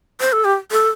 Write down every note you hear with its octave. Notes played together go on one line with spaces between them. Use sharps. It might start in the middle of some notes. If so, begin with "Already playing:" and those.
C5
A4
G4
A4